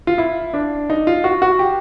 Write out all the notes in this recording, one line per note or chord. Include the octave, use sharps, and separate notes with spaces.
F4
E4
D4
D#4
F4
F#4
F#4
G4